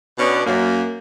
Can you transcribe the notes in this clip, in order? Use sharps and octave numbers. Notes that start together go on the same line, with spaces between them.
B2 B3 C#4 D4
F#2 A#3